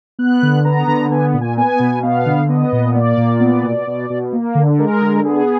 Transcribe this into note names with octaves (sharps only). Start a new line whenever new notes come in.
B3 F#6
D3
B3 A#5
D3
B3 G#5
A#2
G#5
B3 G#5
B2
B3 F5
D3
B3 D#5
A#2
A#3 D5
A#2
B3
B2
B2
B2
A#3
D3
G#3 A#4
D3
B3 G#4